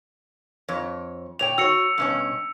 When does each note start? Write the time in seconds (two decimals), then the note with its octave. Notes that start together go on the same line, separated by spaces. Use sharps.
0.68 F2 C#5
1.39 A#2 C#5 G5 F7
1.58 F#4 C#5 E6 C#7
1.98 G2 B2 C#4